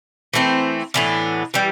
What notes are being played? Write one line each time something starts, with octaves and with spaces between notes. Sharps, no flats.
E3 A3 C4
A2 E3 B3 D4
E3 G3